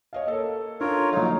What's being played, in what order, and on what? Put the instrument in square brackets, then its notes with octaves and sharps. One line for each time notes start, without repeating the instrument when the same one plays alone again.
[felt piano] C#5 D#5 F5
A#3 A4
[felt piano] D4 A4 [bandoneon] F4 A#4 C#5
[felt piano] A#1 F5 [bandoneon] F#3 D#4